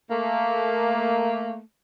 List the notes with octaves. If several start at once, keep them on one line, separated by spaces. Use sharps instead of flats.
A3 A#3